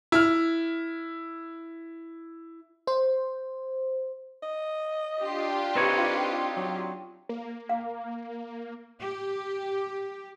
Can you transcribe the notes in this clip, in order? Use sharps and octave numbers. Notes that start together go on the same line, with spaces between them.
E4 F6
C5
D#5
D4 F4 G4
C4 D#4 B4 C#5
F#3
A#3
F5
G4